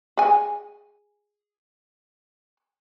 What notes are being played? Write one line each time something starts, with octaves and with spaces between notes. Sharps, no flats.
G#4 G#5